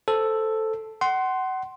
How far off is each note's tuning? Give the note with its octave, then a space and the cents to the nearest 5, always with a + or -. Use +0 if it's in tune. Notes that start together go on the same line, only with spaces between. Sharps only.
A4 +0 C5 +0
F#5 +25 C6 +0